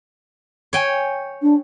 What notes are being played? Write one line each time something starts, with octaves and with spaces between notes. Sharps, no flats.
C#5 G5 G#5
D4